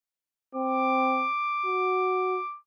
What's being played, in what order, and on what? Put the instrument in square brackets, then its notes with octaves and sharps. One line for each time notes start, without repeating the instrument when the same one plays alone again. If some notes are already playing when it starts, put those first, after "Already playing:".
[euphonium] C4 [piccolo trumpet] D6
[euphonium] F#4